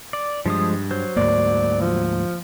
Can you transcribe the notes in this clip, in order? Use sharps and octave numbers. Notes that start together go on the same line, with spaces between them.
D5
G2 F3 G#3 D#6
F#3 C5
D2 G#2 A#3 D5
F3